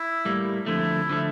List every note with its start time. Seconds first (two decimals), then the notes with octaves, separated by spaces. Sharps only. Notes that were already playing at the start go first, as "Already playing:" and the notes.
Already playing: E4
0.25 A2 G3 A#3
0.66 F2 D3 F3 A3 E4
1.10 D3 F3 A3